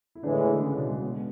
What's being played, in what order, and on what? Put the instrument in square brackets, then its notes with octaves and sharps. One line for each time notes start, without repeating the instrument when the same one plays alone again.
[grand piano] E4
[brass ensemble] A2 E3 G#3 [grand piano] D3 D4
[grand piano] D3 D4
C#3 C#4
B2 B3
G#3
B2 B3